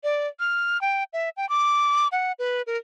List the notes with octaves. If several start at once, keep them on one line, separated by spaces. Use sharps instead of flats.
D5
F6
G5
E5
G5
D6
F#5
B4
A#4